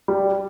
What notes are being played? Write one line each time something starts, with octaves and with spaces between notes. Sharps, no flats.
G3